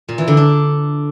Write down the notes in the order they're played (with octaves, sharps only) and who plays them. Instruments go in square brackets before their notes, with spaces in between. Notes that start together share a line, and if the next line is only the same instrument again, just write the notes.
[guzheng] A#2
E3
D3
D4